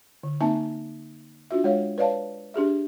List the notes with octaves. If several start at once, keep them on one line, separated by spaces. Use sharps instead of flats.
D3
A#3 C4 D#4 E5 G#5 A5
D4 F4 F#4 E5
G#3 C#5 F5
B4 C#5 D5 F5 A5
D4 G4 G#4 E5